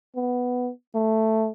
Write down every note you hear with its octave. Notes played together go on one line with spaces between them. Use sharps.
B3
A3